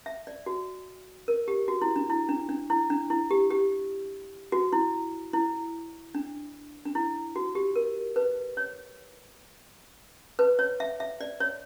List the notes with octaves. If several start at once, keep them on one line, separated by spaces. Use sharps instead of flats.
E5
D5
F#4
A#4
G4
F#4
E4
D4
E4
D4
D4
E4
D4
E4
G4
G4
F#4
E4
E4
D4
D4
E4
F#4
G4
A#4
B4
C#5
B4
C#5
E5
E5
D5
C#5